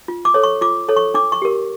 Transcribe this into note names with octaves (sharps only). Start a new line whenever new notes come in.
F4
D6
A4 C#5
C#6
F4 D6
A4 C#5
C#6
D4 D6
C#6
G4 A#4